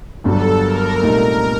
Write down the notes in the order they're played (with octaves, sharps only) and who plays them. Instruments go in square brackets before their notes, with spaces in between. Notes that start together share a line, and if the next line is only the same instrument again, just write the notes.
[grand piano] G1 G2 F#3 [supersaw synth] A4
[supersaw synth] A#4
[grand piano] C2 A#2 A3 D#4